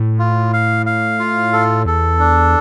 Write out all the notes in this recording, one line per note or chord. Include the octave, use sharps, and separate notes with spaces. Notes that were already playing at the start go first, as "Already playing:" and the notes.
Already playing: A2
F4
F5
F5
F4
A4
E2 A4
D4